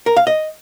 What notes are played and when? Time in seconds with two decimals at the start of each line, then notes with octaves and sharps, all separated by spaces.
0.06 A#4
0.17 F5
0.27 D#5